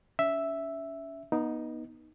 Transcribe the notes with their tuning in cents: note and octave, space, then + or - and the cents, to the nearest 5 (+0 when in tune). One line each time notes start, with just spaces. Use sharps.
C#4 +35 E5 +0
B3 -30 D#4 +0